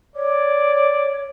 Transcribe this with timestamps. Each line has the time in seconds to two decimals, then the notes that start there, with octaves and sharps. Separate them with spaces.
0.16 C#5 D5